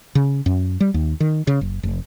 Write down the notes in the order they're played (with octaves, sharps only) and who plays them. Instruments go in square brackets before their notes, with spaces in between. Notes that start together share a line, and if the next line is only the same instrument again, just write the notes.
[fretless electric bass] C#3
F#2
G3
D#2
D#3
C#3
F#1
F1